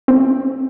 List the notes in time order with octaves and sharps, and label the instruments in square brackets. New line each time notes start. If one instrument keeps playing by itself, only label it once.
[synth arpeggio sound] C4